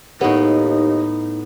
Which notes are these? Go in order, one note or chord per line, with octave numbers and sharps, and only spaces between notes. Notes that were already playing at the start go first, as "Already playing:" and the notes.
D#2 A2 B3 D#4